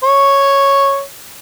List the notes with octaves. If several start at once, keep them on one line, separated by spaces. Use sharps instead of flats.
C#5